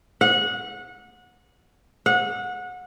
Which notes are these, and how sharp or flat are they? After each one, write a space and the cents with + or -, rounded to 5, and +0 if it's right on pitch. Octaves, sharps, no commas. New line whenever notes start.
F#5 -25
F#5 -25